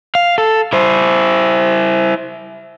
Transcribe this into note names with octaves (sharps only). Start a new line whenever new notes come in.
F5
A4
E4 C5